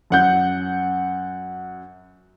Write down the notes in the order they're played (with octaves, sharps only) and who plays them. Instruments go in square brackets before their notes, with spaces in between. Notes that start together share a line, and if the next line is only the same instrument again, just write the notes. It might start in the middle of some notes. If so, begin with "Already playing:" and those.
[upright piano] F#2 F#5 G6